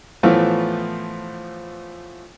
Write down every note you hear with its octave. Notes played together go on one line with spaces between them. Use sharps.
A2 E3 F3 A3 B3 F4